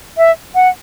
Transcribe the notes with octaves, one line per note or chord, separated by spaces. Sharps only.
E5
F#5